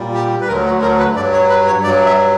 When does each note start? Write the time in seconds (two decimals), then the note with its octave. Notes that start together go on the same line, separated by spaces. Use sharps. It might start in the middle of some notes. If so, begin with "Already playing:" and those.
Already playing: A#2 G3
0.14 G4
0.41 B4
0.48 D2 D3 F#3 A#4
0.66 F#4
0.82 A#4
0.99 B4
1.16 G2 F#3 D5
1.33 C#5
1.50 B4
1.67 C#5
1.83 G2 F#3 D5
2.06 E5